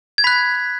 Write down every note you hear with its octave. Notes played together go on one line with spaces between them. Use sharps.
G#6
B5 F#6 B6